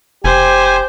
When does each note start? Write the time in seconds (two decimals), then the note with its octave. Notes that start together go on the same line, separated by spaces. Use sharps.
0.24 F1 G4 C5 G#5